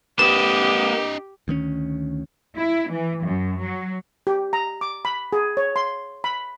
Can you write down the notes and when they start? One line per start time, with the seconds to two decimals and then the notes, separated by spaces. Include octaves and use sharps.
0.19 A#3 D4 G4 B4 D#5 E7
1.48 D2 D#3 A#3 C#4
2.57 E4
2.90 E3
3.23 F#2
3.61 F#3
4.27 G4
4.53 A#5
4.81 D6
5.05 B5
5.33 G#4
5.57 C#5
5.76 C6
6.24 B5